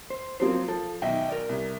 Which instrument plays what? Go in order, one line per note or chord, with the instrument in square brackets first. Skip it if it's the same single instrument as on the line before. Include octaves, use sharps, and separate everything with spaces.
[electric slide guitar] C5
[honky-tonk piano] F3 F#3 A#3 [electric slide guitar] C4 C5
[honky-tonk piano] F3 [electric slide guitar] A4
[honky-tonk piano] B1 D#3 [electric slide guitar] D#5 E5 G5
[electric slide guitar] A#4 D5
[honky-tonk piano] C2